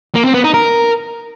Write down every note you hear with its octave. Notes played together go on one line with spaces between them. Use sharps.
A#3
C4
B3
D#4
A#4